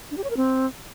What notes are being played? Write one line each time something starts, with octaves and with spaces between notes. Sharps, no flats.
D4
G4
C#5
A#4
C4